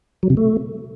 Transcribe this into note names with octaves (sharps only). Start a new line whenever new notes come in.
F#3
C3
A3